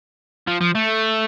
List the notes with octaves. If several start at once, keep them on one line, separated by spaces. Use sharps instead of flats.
F3
F3
A3